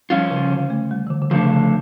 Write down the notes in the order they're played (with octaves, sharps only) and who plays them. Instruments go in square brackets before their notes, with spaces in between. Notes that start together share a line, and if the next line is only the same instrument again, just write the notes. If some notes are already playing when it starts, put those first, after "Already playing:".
[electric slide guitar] F3 C#4 F4 [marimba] G3
[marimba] C#3
D3
A3
G3
E3
D3
D3
[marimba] C#3 [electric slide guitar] F3 A3 D4
[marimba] C#3
D3